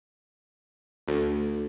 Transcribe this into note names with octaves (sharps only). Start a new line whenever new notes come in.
D2